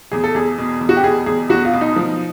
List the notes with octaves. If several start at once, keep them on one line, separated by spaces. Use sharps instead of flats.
E2 G#4
A4
E2 G#4
B2
E2
F#4
G4
B2 G#4
E2 G#4
E2 F#4
F4
B2
D#4
F3